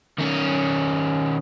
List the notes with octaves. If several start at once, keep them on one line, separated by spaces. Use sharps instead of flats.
D#3 C#4